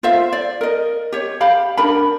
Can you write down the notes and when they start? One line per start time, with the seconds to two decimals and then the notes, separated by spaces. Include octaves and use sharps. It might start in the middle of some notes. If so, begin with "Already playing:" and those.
0.03 F4 C5 E5 F5
0.33 D5
0.61 A#4 D#5
1.12 G4 C#5
1.41 G4 F5 B5
1.77 D4 A#4 B5